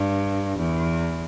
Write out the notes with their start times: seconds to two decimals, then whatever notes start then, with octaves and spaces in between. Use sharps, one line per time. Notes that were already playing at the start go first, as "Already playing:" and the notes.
Already playing: G2
0.59 E2